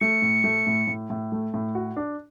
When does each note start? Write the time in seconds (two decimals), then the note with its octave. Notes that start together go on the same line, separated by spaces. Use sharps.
0.01 A3 C#7
0.22 A2
0.44 A3
0.67 A2
0.87 A2
1.10 A2
1.32 A3
1.54 A2
1.75 F#4
1.96 D4